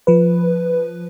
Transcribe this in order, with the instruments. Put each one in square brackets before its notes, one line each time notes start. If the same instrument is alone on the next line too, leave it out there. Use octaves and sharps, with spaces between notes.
[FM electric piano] F3 B4